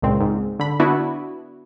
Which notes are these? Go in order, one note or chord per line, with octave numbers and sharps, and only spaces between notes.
C#2 A#2 C4
G#2
D3 B5
B3 D4 E4 F#4